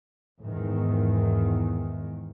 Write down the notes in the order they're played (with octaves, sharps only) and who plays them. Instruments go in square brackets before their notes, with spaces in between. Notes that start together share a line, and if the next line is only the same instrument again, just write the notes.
[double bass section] E2 G#2 D#3